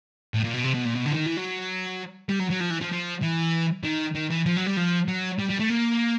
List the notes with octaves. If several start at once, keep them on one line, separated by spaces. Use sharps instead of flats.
A2
A#2
B2
C3
B2
A#2
B2
D3
E3
D#3
E3
F#3
G3
F#3
F#3
F3
E3
F3
F3
E3
D#3
D#3
E3
F3
F#3
G3
F3
F#3
G3
G3
A3
A#3